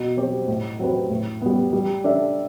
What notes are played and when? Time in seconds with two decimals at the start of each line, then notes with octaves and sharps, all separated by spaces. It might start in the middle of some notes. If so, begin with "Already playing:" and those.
Already playing: B2
0.17 F#3 C4 G4 C5
0.48 A2
0.79 F#3 C4 G4 B4
1.10 A2
1.42 G3 B3
1.73 G3
2.04 D4 A4 E5